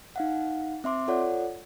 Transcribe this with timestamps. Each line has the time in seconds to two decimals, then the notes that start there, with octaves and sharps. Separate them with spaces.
0.16 D#4 F5 F#5
0.84 C4 E5 C6 D6
1.08 F4 A4 C#5 D5 F#5